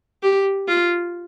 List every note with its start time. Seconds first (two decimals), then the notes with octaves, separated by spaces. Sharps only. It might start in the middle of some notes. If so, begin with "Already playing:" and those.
0.23 G4
0.68 F4